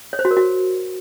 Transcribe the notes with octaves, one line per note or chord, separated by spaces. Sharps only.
C#5
C5
F#4
A#4
F#4